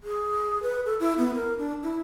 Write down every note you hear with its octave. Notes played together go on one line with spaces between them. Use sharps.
G#4
B4
A4
E4
B3
A#4
D4
E4